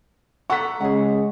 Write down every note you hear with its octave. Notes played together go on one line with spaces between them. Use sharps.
A4 F#5 A#5 C#6 B6
C#3 G#3 G#4 F#5